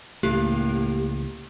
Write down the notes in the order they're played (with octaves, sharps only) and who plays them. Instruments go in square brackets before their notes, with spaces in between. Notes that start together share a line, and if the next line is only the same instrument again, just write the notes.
[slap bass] C#2 C#3 E3 [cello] A2 A#3 [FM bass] A3 [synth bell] G4